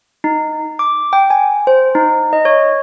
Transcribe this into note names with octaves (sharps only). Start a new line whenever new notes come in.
D#4
D6
G5
G#5
C5
D#4
D#5
C#5